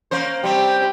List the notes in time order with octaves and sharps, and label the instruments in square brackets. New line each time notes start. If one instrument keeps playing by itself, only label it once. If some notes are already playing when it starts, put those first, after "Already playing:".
[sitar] A#3 C#4 C5
[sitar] G3 C4 [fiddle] G4